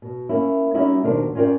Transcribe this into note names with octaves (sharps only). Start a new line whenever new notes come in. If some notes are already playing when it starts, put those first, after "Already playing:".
B2
A#3 C#4 E4
G3 C#4 D#4 E4 F#4 D#5
D#2 B2 D#3 D4 A#4 C5
C#4 F4 A#4 D5 G5